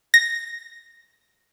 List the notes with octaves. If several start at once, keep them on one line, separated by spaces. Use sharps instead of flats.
A#6